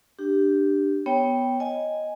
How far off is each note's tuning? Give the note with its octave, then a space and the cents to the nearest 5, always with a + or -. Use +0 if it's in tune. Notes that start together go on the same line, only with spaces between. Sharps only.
D4 +10 G4 +0
B3 +0 C#5 +0 G5 +0
D#5 +0 G#5 +0